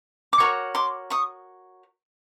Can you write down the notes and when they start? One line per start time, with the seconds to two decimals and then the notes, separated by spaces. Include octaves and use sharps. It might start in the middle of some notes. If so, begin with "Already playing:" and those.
0.33 D6
0.40 F#4 A#4 C#5 C#6
0.75 C6 D6
1.10 C#6 D#6